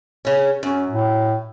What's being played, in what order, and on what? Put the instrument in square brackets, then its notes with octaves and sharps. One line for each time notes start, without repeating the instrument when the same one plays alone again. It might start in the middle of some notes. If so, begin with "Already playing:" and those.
[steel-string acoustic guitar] C#3 C#4
[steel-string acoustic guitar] F#2 [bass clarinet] C#4
[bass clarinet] A2